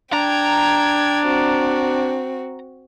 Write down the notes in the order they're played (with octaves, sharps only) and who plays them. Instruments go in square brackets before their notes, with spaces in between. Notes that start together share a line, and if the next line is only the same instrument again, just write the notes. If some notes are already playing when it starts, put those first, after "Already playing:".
[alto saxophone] D4 [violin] G5 G#6 [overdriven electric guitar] A#5
[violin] C4 F#4